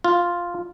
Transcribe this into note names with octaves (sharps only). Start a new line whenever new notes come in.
F4